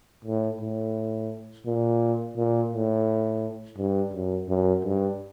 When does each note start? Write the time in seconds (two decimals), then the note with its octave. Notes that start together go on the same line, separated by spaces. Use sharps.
0.25 A2
0.61 A2
1.66 A#2
2.37 A#2
2.73 A2
3.78 G2
4.13 F#2
4.49 F#2
4.85 G2